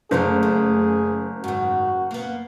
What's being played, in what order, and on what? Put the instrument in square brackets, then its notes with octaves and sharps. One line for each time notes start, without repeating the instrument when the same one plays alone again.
[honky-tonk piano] F#1 [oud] D3 A3 C#4 [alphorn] G#4
[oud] A3
[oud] G#2 D#3 [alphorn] F#4
[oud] A#3 B3